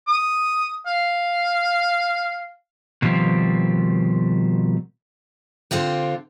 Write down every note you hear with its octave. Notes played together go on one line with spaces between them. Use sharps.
D#6
F5
B2 D#3 F3 G3 C4
D3 C4 F4 G4